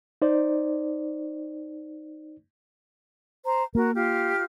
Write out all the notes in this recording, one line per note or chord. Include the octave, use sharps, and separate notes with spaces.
D#4 C5 D5
C5 A#5
A#3 F#4 A#4
F4 G4 F6